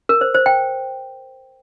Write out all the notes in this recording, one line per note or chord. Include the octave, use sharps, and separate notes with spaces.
A#4
C5
C5
G5